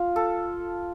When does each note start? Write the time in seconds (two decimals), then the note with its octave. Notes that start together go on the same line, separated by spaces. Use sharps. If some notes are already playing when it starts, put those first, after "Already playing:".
Already playing: F4
0.16 A4